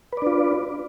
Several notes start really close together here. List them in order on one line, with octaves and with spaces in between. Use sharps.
B4 D5 D4 F4